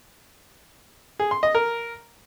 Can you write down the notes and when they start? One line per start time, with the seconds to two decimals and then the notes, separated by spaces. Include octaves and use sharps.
1.19 G#4
1.31 C6
1.43 D#5
1.55 A#4